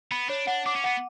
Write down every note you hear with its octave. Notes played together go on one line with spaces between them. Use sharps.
B3 B5
D4 C#5
D4 F#5
D4 D6
C#4
B3 F#5